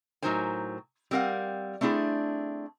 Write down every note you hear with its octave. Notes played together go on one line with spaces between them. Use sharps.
A2 F#3 D#4 A#4 C5 G#5
G3 C4 A#4 F5 F#5
A3 C4 D4 E4 G#4